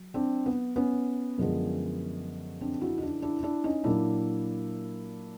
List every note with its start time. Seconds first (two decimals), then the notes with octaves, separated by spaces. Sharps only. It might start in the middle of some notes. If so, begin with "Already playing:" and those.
Already playing: F#3
0.14 C4 D4
0.46 B3
0.76 B3 C#4
1.38 F#2 D3 F3 G#3 B3
2.61 C4 D4
2.81 E4 F#4
2.98 D#4
3.02 D4 E4
3.22 D4 E4
3.43 D4 E4
3.64 C#4 D#4
3.84 A#2 F#3 A#3 D4 E4